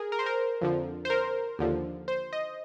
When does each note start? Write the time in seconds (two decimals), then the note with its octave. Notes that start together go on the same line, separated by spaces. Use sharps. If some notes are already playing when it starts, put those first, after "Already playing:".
Already playing: G#4 A#4
0.12 A#4
0.19 C5
0.26 A#4
0.61 F2 D3 F3
1.05 C5
1.10 A#4
1.59 D#2 D3 F3
2.08 C5
2.33 D#5